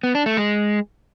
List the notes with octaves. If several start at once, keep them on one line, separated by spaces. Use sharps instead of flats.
B3
D4
A3
G#3